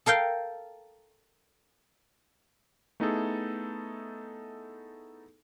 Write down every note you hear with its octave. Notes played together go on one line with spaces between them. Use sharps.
A4 A#4 F5 G5
A3 B3 D#4 E4 G#4 A4